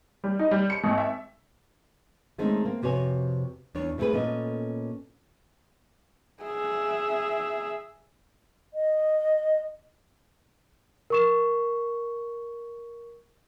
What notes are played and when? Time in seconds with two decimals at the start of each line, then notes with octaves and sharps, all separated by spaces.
0.24 G3
0.39 D#4
0.51 G3
0.70 C#7
0.84 G#1
0.98 E5
2.38 D#3 G#3 A3 C4 C#4 D#4
2.65 A#3 C4
2.82 F2 C3 F#4 B4 C#5 G#5
3.75 E2 E3 D4 C#5
3.98 A2 A3 C4 F#4 G#4 B4
4.13 A#2 B3 C#4 A4 D#5
6.43 G#4 E5
8.74 D#5
11.10 A#4 C#6 E7